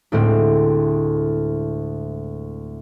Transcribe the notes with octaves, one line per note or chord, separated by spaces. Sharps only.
D2 A2 G#3 C4